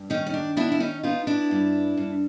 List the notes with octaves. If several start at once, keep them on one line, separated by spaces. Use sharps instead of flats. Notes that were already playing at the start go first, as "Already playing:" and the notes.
Already playing: G2
D#3 C#4 D#4
C#4
D4
B3 D4 E4
E4
C#4 D#4
B3 D#4 F4
D4 E4
G2
G2